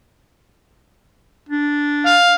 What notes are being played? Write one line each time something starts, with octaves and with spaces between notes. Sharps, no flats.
D4
F5